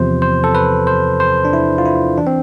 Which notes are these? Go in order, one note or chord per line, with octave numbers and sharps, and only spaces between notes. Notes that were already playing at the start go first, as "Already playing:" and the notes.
Already playing: E2 C3 F3 C5
C5
A4
B4
C5
C5
D4
E4
F4
E4
E3 D4
C4